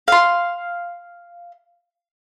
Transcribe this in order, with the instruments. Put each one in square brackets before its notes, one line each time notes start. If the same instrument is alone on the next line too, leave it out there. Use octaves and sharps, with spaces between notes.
[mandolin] F5 C6